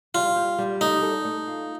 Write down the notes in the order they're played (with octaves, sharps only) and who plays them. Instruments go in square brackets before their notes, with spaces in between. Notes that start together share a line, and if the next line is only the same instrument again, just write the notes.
[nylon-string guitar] G3 [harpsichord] F4
[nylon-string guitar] G3
G3
[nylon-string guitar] A3 [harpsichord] D#4
[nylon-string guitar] A4
A3
F4